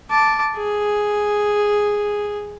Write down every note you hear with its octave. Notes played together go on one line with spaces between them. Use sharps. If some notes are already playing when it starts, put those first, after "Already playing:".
A5 D6
G#4